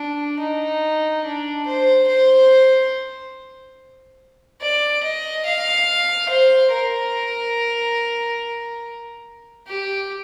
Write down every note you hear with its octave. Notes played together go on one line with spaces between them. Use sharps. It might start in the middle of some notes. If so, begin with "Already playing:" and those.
Already playing: D4
D#4
D4
C5
C5
D5
D#5
F5
C5
A#4
G4